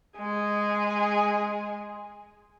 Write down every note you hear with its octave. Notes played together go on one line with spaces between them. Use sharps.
G#3 G#4